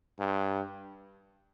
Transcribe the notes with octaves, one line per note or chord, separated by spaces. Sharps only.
G2